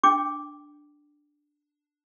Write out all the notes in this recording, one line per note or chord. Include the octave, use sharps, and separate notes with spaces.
D4 G5 D6